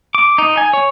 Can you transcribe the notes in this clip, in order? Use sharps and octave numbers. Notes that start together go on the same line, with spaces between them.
D6
D#4
G#5
C#5